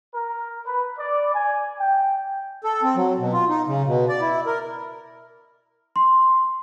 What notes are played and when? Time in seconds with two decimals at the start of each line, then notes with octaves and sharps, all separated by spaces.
0.14 A#4
0.66 B4
0.98 D5
1.34 G#5
1.80 G5
2.64 A4
2.83 C4
2.96 F#3
3.19 B2
3.33 F4
3.49 D#4
3.67 C#3
3.86 B2
4.09 D5
4.21 E4
4.46 A#4
5.96 C6